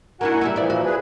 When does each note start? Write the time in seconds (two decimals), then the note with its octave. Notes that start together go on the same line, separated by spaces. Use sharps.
0.21 A#3 D4 E4 F#4 F#5 G#5
0.41 G3 A#3 E4
0.56 A#2 E3 F3 E4 D5
0.70 F#4
0.85 G#4 B4